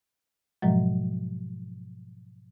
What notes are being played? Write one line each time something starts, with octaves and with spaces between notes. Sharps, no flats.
G#2 B2 F3 F#3 G#3